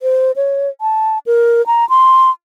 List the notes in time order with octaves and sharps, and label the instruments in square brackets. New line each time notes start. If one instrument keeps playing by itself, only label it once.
[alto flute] C5
C#5
A5
A#4
A#5
C6